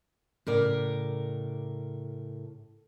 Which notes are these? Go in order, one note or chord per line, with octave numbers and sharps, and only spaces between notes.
A2 C#3 A#4 D5